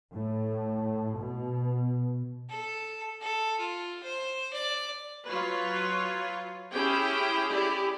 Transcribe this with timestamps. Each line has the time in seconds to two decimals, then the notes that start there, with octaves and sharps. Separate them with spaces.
0.14 A2
1.20 B2
2.49 A4
3.21 A4
3.59 F4
4.03 C5
4.53 D5
5.28 F#3 F4 B4 C#5
6.73 C#4 E4 G4 G#4 G5
7.50 E4 G4 G#4 D5